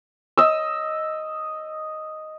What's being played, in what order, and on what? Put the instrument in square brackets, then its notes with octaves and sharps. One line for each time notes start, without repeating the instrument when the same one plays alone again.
[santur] D#5 E6